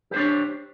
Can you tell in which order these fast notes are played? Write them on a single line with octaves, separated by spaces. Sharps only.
G4 C5 D4 C#5